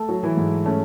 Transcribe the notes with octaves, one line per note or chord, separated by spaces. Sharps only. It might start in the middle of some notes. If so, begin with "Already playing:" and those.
Already playing: A3 A4
F#3
E3 E4
G#2
A3 C#4